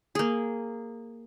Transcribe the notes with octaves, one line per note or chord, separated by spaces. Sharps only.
A#3 G#4